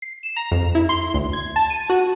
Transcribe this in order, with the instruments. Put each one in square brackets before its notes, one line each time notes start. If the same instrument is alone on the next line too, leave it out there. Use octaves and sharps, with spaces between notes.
[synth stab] C7
E7
A#5
F2
E4
C6
D2
G#6
A5
D#7
F#4